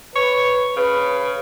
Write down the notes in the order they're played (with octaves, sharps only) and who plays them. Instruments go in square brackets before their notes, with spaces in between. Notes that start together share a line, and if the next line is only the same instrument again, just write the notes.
[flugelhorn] B4 [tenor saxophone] C#5
[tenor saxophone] C#3 [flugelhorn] B4